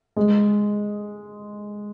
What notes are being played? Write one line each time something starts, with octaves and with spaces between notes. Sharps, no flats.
G#3